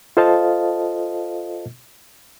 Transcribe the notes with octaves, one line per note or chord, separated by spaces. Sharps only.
F4 A4 C5 D#5 F5 A5